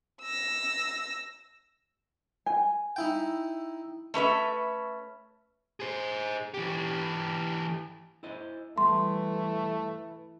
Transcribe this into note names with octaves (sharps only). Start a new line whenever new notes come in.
E6 A#6
G#5
D#4 E4 G5
A3 C#4 B4 E5
G#4 C5
E3 G4
E4 C5 D#5
E3 G3 A3 C6